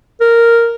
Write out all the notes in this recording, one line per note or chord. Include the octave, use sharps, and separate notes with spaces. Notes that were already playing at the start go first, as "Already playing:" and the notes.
A#4